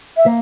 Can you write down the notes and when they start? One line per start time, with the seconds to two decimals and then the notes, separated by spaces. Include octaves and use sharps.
0.16 E5
0.26 A#3